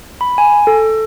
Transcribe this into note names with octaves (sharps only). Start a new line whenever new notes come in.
B5
G#5
A4